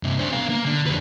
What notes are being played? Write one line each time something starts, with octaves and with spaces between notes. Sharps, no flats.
G2 C3
D4 C5
B3 F5
A#3
D3
F2 B4